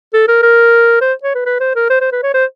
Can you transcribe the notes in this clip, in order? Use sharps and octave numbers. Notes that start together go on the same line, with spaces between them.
A4
A#4
A#4
C5
C#5
B4
B4
C5
A#4
C5
C5
B4
C#5
C5